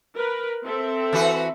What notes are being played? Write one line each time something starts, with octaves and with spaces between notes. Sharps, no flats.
A#4 B4
C4 A4 E5
E3 F#4 B4